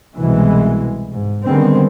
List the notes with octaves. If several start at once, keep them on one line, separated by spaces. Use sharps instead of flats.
C2 B2 E3 G#3
G#2
D3 D#3 G3 G#3 B3 C4